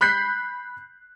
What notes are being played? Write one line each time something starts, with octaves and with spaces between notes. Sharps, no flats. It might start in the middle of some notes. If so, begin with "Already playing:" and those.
B5 F#6 G6 B6 C7